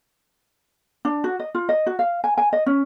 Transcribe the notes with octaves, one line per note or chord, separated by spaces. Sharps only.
D4
F#4
D#5
F4
D#5
F#4
F5
G#5
G#5
D#5
C#4